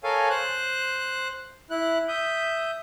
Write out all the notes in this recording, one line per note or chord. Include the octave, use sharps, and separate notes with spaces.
A4 A#4 C#5 F5 G#5
C5 F#6
E4 F#6
E5 D#6 G6